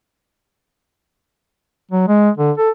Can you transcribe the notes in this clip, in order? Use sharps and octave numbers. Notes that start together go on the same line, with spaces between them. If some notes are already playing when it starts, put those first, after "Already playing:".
F#3
G#3
D3
A4